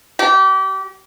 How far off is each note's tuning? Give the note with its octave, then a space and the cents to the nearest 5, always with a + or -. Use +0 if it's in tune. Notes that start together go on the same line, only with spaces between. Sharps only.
G4 -30